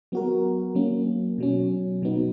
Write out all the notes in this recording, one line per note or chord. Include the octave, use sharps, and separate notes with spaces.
F#3 B3 F#4 A#4
F#3 A#3 C#4
B2 F#3 C#4
B2 F#3 B3 D#4